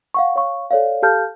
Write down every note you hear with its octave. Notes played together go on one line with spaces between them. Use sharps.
F5 F#5 C#6
C#5 F5 C#6
A4 C#5 D5 F5
G4 A4 F5 A5 F6 G6